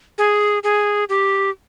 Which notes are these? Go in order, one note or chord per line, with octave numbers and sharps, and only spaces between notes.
G#4
G#4
G4